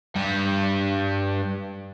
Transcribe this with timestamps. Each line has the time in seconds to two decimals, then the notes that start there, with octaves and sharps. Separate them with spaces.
0.16 G2 G3